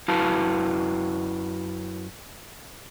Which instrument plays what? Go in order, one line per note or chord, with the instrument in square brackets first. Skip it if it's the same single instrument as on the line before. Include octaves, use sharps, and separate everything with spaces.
[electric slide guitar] F#2 E4 F#4 B4 F5 A5